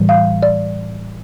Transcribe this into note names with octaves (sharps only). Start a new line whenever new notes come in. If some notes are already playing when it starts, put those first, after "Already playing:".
Already playing: A2 E3 G3
F5
D5